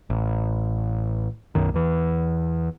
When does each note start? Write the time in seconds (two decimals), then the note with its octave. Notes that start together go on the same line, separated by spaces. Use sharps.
0.10 A1
1.55 B1 F#2 D#3
1.74 E2 E3